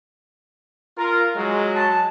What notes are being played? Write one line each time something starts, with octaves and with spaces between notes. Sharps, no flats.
F4 A#4
F#3 G#3
A5